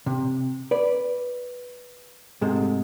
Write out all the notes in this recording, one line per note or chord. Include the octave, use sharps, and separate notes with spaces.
C3
B4 D5
G#2 C3 G#3 A3